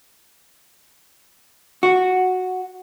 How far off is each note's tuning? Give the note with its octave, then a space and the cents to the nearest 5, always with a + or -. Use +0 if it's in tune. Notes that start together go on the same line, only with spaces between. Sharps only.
F#4 -5